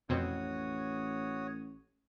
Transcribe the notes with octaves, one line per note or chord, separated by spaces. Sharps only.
A1 F2 B2 C4 F#4 C#5 D#6